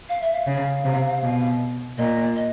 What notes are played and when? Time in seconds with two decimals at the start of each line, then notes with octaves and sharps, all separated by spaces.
0.09 F5
0.21 E5
0.33 F5
0.47 C#3
0.84 C3
1.22 B2
1.98 A#2 D#5
2.35 D#5